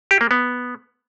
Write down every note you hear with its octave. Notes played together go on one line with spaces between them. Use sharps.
G4
A#3
B3